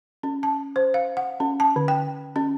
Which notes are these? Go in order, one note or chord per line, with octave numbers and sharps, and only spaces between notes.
C#4
A5
C5
F5
F#5
C#4
A5
D3
G5
C#4